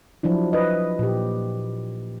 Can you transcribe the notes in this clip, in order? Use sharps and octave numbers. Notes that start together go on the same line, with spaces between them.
F3 F#3 D4 E4
B4 D#5
A#2 G4